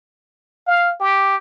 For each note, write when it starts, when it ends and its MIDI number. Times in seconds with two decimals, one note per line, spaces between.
0.67 0.94 77
1.00 1.36 67